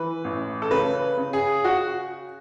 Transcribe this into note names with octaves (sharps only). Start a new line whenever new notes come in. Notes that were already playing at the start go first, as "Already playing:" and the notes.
Already playing: E3 B4
A1
A4
C#3 B4
C#3
G#4
F#4